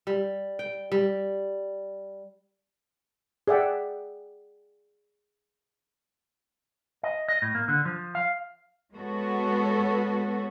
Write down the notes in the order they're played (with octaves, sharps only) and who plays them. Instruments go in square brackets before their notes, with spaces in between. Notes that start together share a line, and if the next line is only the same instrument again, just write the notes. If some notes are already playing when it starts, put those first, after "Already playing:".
[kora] G3
G5
G3
[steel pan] G#4 D5 E5 F#5 G5
[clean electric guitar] D#5
D#5
A2
A#3
D3
F3
F5
[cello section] G#3 B3 F#4 A4 C#5